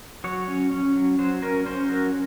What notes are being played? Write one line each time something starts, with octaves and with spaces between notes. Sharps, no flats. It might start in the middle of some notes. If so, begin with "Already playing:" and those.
F#3 C#5
C#4
C#4
F#3
F#3 C5
C#4 A#4
C#4 C5
F#3 A#4